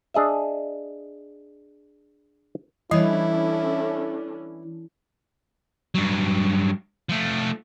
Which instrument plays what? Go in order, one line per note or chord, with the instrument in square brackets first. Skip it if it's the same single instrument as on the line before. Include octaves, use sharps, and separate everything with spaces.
[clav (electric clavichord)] D4 G#4 D#5 E5
[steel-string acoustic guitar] E3 [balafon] G3 C#5 [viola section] C#4 D4 A4 [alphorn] E4
[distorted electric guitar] G2 F#3
F3 A3